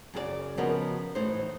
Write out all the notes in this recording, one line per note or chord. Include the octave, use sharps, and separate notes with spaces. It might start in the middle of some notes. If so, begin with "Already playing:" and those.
F#2 C#3 G4 D5
C#3 F3 B3 F#4 A#4 D#5
A2 E3 D#4 C5